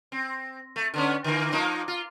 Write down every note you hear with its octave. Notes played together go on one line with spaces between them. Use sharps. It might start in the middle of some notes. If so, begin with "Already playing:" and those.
C4
A3
D3 B3 C#4
D3 E3 A#3
F3 A#3 D#4
F4